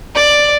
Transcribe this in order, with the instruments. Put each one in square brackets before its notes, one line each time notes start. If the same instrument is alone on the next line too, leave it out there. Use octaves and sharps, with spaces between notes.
[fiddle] D5